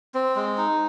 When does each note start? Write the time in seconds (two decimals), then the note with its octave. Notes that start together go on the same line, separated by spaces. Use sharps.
0.15 C4
0.36 G#3
0.58 D#4